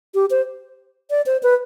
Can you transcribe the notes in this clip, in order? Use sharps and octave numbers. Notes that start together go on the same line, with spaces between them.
G4
C5
D5
C5
B4